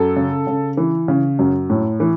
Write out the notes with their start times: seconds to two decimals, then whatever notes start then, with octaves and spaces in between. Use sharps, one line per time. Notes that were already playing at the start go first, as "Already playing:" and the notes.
Already playing: F#2 A4
0.16 C#3
0.47 C#3
0.77 E3
1.08 C#3
1.39 F#2
1.70 A2
2.00 E3